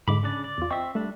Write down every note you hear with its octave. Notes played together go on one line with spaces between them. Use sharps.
G#2 D3 G#3 B5 D6
C#3 D4 D5
D5
E2 F4
C4 D#5 E5 G5 C#6
G3 A3 D4